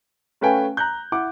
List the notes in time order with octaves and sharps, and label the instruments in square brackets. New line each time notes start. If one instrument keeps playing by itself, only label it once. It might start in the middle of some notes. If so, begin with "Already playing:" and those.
[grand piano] A3 C#4 B4 F5 G5 G#5
A#5 F#6 G6
E4 F#5 D6